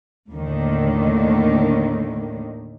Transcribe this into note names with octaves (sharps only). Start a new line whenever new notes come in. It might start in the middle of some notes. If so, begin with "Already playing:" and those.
D#2 A2 D3 D#3